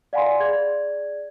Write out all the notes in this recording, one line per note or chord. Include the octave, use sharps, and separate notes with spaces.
D5 F5 F#5 G#5 B5 C6
G#4 D5 G#6